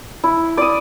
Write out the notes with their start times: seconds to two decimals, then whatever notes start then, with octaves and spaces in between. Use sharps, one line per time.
0.24 E4
0.57 D5 D#6